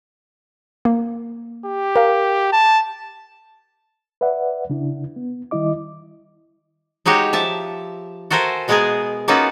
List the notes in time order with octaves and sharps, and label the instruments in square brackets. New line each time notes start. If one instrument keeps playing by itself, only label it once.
[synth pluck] A#3
[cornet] G4
[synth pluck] A#4 F5
[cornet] A5
[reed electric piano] B4 D5 E5 F#5
C#3 D4 E4
B3
D#3 G3 E4 D#5 D6
[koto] G#3 D#4 F#4 G4 C#5
F3 E5 A5
F#4 A4 A#4 C5 E5 G#5
B2 G#3 B3 G#4 A#4 G#5
A#3 B3 C#4 D#4 F4 F#4